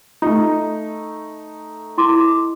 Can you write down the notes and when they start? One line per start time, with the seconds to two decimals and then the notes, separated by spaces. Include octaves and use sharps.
0.22 A3 D#4
1.98 E4 C6 D6